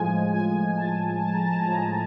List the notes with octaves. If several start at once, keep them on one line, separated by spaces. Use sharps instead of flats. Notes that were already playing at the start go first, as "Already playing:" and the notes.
Already playing: A2 F3 G#3 G#5
G#5
G#5
A2 F3 G#3 A5
A5
A#5
A5
A2 F3 G#3 A#5